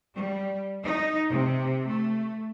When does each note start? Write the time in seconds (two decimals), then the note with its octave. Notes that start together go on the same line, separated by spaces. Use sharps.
0.17 G3
0.83 D#4
1.31 C3
1.88 A3